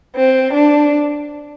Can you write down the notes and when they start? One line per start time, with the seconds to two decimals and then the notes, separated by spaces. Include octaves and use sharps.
0.16 C4
0.54 D4